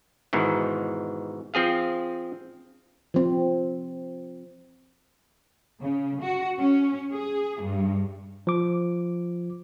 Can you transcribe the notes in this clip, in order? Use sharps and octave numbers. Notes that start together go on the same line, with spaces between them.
G#2 B2 D#3 E3
F3 C4 G#4 F5
F3 C4
C#3
F#4
C#4
G#4
G2
F3 D6